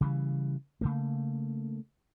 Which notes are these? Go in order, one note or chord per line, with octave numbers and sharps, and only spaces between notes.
C#3 E3 G3
C#3 A3 A#3